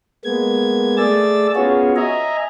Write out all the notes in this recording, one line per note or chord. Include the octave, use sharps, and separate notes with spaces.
G#3 A#3 B3 G#6
A3 G#4 D5 E6 A6
B3 C#4 F4 F#4 G#4 C#5
D#5 E5 G#5 A#5